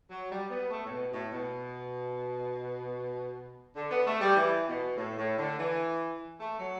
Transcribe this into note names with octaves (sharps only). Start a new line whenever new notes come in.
F#3
G3
B3
A3
A2
B2
A2
B2
D3
B3
A3
G3
E3
B2
A2
A2
D3
E3
A3
F#3